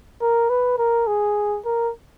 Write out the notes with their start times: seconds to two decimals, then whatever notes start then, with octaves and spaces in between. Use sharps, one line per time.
0.22 A#4
0.50 B4
0.79 A#4
1.07 G#4
1.65 A#4